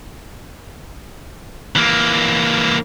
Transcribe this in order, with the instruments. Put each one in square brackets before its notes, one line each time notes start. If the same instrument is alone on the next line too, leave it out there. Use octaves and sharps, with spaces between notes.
[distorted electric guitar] E3 A#3